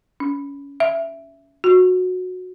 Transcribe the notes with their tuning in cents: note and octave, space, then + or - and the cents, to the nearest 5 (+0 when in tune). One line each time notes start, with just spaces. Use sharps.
C#4 +20
E5 +10
F#4 -15